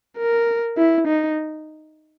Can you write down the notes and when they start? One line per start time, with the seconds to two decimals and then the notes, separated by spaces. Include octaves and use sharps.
0.18 A#4
0.78 E4
1.07 D#4